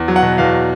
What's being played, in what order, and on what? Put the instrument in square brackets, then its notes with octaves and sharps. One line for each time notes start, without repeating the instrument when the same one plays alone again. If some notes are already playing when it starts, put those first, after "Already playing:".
Already playing: [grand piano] E2
F#3
F#5
B2
E2 F5